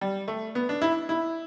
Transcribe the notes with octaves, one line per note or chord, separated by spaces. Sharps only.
G3
A3
B3
D4
E4
E4